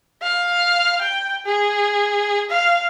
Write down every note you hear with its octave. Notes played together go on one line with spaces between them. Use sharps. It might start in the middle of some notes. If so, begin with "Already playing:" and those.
F5
G5
G#4
F5